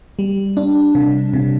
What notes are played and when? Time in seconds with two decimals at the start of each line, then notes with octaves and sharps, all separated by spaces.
0.19 G3
0.57 D4
0.95 C3
1.33 C3